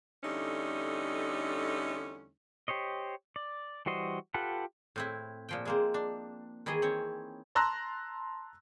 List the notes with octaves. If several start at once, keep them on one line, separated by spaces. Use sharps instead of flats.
E2 D3 G3 A3 C#4 D#4
G4 C5 C#5 D#5
D5
E3 G3 F#4 C5 D#5
F4 G4 A4 B4 F#5
A2 C4 E4
A#2 F3 G5
G#3 A#3 C4
D4
D#3 E3 E4 G#4 D#5
C4 C#5
A5 A#5 C6 E6 F#6 A#6